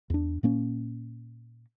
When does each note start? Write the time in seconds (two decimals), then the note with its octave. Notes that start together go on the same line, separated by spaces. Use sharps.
0.10 E2 D4
0.43 A#2 A#3 C#4